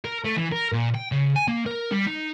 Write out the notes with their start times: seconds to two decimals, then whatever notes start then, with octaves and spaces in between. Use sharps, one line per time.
0.04 A#4
0.24 A3
0.37 E3
0.52 A#4
0.72 A#2
0.94 G5
1.12 C#3
1.36 G#5
1.48 A#3
1.66 A#4
1.92 G3
2.07 D#4